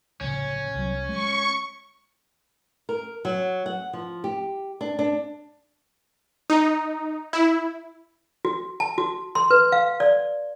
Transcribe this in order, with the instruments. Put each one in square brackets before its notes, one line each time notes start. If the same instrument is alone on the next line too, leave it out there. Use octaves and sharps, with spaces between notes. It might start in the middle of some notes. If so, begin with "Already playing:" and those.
[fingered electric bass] D1 A#1 C#3 [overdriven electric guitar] C#4
[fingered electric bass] C2 F#3
[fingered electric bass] G#3 [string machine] C#6
[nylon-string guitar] A#4
F#3
F#5
F3
G4
D4
D4
[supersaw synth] D#4
E4
[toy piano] F#4
A5
F#4
C6
B4
F5
D5